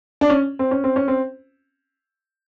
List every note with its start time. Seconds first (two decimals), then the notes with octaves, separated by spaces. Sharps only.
0.21 D4
0.30 C#4
0.59 C4
0.71 C#4
0.84 C4
0.96 C#4
1.08 C4